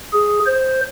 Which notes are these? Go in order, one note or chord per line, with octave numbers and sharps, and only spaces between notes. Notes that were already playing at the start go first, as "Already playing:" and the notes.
G#4
C5